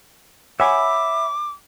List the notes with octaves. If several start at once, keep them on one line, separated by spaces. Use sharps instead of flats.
C#5 E5 F#5 G#5 B5 D6